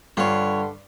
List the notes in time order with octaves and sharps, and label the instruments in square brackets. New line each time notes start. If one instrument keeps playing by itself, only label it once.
[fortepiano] G2 [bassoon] D3 [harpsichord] F4 C#5